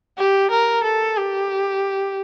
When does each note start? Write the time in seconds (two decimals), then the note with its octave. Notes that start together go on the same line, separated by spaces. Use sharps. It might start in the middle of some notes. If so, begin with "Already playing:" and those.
0.18 G4
0.51 A#4
0.84 A4
1.17 G4